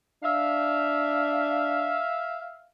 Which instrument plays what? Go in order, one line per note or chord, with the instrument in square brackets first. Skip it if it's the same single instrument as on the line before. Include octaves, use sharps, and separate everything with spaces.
[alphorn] D4 [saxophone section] E5 F5